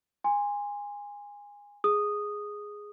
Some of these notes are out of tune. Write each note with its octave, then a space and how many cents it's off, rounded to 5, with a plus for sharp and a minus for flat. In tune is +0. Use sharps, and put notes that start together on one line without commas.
G#5 -20 C6 +0
G#4 +0 D#6 -5